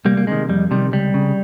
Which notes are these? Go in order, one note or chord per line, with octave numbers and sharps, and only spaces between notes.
C2 G3 A#3
A#3
C3 D#3 G#3
F2 G3
C3 D#3 G3
C#2 G3
C#3